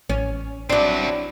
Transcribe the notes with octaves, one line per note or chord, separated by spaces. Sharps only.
A1 C#4
F#3 C4 D4 E4